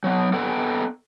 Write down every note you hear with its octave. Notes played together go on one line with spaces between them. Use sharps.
F#3 B3
B3 A4 G5